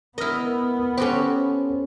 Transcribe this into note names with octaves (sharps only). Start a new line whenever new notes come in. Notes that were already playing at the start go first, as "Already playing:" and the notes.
B3 E4 A#4 D#5 F6
C#4 F#4 G4 A4 C5